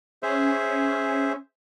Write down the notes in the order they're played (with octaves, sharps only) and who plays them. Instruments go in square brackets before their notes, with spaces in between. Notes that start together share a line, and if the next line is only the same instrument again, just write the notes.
[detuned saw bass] C#4 [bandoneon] G#4 C5 E5